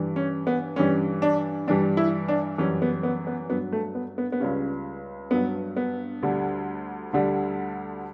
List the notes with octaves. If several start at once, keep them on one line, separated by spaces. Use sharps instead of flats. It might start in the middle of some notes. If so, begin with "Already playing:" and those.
Already playing: G2 E3 G3
C#4
B3
G2 E3 G3 C#4
D4
G2 E3 G3 D4
E4
D4
F#2 E3 G3 C#4
B3
B3
B3
G2 F#3 B3
A3
B3
B3
B3
C#2 C#3 G3 C#4
G2 F#3 B3
B3
D2 D3 G3
D2 D3 G3